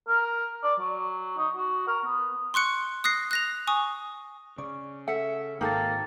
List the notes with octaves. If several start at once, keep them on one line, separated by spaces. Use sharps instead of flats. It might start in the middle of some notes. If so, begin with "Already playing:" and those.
A#4
D5
F#3
D#4
F#4
A#4
B3
C6 C#6 F#6 C#7
D#6 F#6 A#6 C7
F#6 A#6 F7
G#5 C#6 D#6
C#3 D5 C#6
A4 E5 F#5
G#1 A#3 D#4 A4 G5 A6